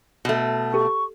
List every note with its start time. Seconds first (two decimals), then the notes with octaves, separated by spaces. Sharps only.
0.25 B2 A3
0.74 G4 A4 C#6